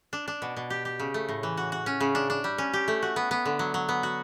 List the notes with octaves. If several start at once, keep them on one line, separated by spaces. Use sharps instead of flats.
D4
D4
B2
B2
G4
G4
C#3
A3
A2
E3
F#4
F#4
C#4
C#3
D4
D4
G3
C#4
G4
A3
F#4
B3
B3
D3
F#3
F#3
B3
F#4